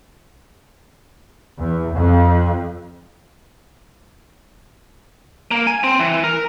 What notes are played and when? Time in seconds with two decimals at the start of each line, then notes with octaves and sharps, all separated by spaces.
1.59 E2
1.95 F2
5.51 A#3
5.67 G#5
5.84 C4
5.99 E3
6.24 A#4